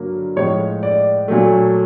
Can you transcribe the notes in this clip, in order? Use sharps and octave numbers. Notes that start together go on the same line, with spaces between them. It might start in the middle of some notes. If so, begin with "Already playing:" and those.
Already playing: G2 D3 F#3 A#3
A2 F3 G#3 C#5
D5
A#2 F#3 A3